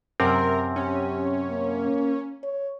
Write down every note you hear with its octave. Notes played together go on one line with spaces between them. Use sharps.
F#2 C3 C4 A#4
C#4 G4
A#3
C#5